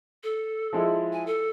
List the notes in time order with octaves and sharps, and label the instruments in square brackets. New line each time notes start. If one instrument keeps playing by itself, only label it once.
[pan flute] A4
[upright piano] F3 G#3 E4
[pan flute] G#5
A4